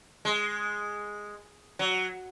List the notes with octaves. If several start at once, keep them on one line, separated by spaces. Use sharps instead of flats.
G#3
F#3